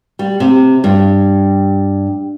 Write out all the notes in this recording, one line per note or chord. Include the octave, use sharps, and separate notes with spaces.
G3
C3
G2